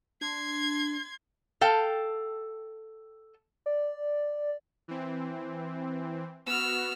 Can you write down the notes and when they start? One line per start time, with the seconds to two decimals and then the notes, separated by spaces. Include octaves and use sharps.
0.21 D4 C6 G#6
1.61 A4 F5 G5
3.66 D5
4.88 E3 C4
6.47 B3 F#4 E6 F6